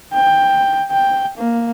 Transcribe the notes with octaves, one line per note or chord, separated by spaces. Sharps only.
G5
G5
A#3